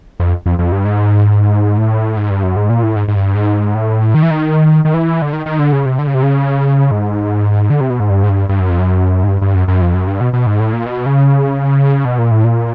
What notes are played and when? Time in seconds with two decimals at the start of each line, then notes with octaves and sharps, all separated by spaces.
0.20 F2
0.46 F2
0.59 F2
0.72 G2
0.85 G#2
1.78 A2
2.17 G#2
2.30 G2
2.43 F#2
2.56 G#2
2.70 A#2
2.83 A2
2.96 G#2
3.08 G#2
3.16 G2
3.35 G#2
3.75 A2
4.14 D#3
4.23 E3
4.31 D#3
4.85 D#3
4.94 E3
5.22 D3
5.33 D#3
5.46 D#3
5.59 D3
5.72 C#3
5.86 C3
5.99 D3
6.07 C#3
6.14 C3
6.23 C#3
6.91 G#2
7.70 D3
7.81 C3
7.90 B2
8.00 G#2
8.10 G2
8.23 G#2
8.30 G2
8.49 G2
8.60 F#2
8.70 F2
8.79 F#2
9.24 G#2
9.28 G2
9.42 G2
9.55 F#2
9.68 F#2
9.81 F2
9.94 F#2
10.07 G2
10.21 B2
10.33 B2
10.47 G#2
10.60 A2
10.73 A#2
10.86 B2
11.06 C#3
12.05 B2
12.19 A#2
12.31 A2
12.44 A#2